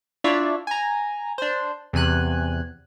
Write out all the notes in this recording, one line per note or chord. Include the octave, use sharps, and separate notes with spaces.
D4 E4 F4 C#5 D5 E5
G#5 A#5
D4 C5
E2 C3 G#5 F#6